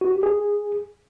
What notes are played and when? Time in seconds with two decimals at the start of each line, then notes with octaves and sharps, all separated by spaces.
0.01 F#4
0.12 G4
0.23 G#4